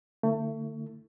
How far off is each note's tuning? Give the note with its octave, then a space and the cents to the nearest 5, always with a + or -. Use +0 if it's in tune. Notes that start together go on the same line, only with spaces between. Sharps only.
D3 +0 A3 +30 E4 +0